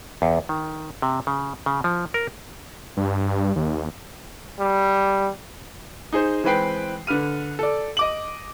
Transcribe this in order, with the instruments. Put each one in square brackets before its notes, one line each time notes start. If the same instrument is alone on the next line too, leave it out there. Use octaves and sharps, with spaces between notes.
[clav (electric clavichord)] E2
D#3
C3
C#3
C#3
F3
A#4
[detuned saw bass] G2
D#2
[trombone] G3
[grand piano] D#4 G#4 C5
E3 G#3 C4 B4 G5 C7
D3 B4 F6 D#7
A4 D5
D#5 D6 F#7